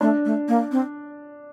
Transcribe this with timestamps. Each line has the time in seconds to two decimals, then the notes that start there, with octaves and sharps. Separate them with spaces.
0.01 A3 D4
0.25 A3
0.48 A#3
0.71 C4